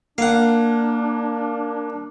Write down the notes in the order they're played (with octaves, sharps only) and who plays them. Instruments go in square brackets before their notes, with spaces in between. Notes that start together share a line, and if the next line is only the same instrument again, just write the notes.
[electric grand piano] A#3 [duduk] D4 [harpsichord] F5 F#5